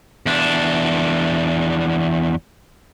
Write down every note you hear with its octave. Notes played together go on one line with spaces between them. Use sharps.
E2 D4